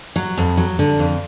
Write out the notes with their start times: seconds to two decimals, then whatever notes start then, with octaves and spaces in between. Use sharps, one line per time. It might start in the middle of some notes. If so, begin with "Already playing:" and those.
0.16 F#3
0.38 F2
0.57 F#3
0.79 D3
0.99 F2